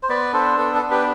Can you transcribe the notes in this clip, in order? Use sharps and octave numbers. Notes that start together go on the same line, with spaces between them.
C5
B3 B4 D5
D4 A4 C5
B3 A4
A4
D4
G4 B4